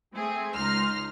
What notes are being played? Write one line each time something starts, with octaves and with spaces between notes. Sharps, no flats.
A3 C4 G#4
C#2 D#4 C6 F6 A#6